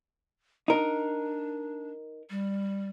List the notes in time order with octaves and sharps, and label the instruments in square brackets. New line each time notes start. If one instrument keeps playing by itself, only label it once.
[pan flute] D4 [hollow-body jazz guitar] D#4 A#4
[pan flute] G3